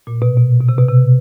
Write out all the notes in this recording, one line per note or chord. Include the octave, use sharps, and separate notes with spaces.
A#2
B2
B2
B2
C3
B2
C3